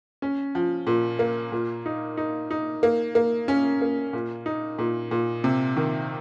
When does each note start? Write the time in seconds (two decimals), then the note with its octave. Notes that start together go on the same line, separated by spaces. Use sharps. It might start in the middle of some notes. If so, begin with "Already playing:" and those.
0.22 C#4
0.55 F3
0.87 A#2
1.19 A#3
1.52 A#2
1.86 D#4
2.17 D#4
2.51 D#4
2.83 A#3
3.15 A#3
3.48 C#4
3.82 A#3
4.13 A#2
4.46 D#4
4.79 A#2
5.11 A#2
5.44 C3
5.77 D#3